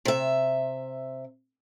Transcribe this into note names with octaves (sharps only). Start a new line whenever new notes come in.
C3 E5